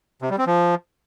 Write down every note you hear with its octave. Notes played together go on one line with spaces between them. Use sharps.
C3
G3
C4
F3